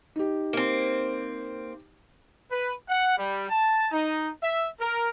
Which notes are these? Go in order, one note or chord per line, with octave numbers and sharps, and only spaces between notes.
D#4 G4
A#3 C4
B4
F#5
G3
A5
D#4
E5
A#4